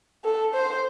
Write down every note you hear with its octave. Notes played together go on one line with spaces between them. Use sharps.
A4
C5